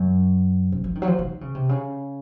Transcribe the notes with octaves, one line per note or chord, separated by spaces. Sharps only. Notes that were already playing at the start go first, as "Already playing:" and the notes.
Already playing: F#2
F#2
F3
D#3
F#3
F3
D#3
C#3
C3
C#3